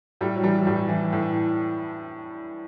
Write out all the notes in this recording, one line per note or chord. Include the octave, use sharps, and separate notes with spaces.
A2 G3
F#3
E3 G3
A2 G3
E3
A2